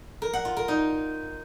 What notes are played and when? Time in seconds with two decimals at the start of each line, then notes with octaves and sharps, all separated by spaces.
0.22 A#4
0.33 F#5
0.45 F4
0.57 A#4
0.68 D#4